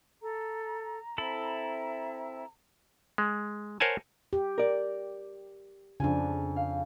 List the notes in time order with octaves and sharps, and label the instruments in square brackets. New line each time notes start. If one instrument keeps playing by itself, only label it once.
[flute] A4 [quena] A#5
[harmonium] C4 [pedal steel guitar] E4 A4 B5 [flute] E5
[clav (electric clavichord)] G#3
A#4 C5 C#5 F#5 G#5 A5
[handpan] G4
[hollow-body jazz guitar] A#4 D5
[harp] F2 F4 G#5 [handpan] C#3 D4
[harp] F5